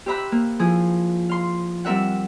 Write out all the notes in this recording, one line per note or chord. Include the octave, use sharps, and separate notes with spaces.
G4 C5 E5 A#5 B5 F#6
A#3
F3 E4 G#4
F5 C6
G3 C4 A#4 E5 F#5